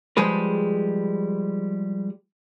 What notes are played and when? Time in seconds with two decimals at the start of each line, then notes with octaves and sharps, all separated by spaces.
0.17 F3 G3 G#3 G#4 B4